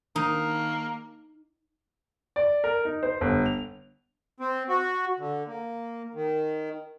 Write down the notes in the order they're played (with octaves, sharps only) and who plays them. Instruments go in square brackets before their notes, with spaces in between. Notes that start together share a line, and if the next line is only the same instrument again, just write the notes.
[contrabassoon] D#3 [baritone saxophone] A#3 [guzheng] D#4
[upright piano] D5
A#4
D#4
C5
G1
F7
[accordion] C4
F#4
D3
A#3
D#3